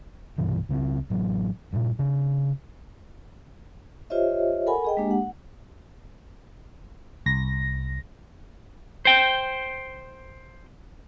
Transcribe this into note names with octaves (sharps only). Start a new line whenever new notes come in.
C2 G2 B2 E3
C#2 C#3 A3 C4
A1 F#3
G2 A#2
C#3 D4
F4 G4 C5 C#5 D#5 E5
A4 A#4 F#5 G#5 B5
G#4 D#5 G5
G#3 A#3 D4 G4
F#5
C2 A#6
C5 G5